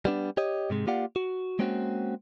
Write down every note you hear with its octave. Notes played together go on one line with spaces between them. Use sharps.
G3 B3 D4
G4 C#5 D#5
G#2 C3 G#3
A#3 F4 G4 D5 F5 F#5
F#4
G#3 A#3 C4 C#4 F#4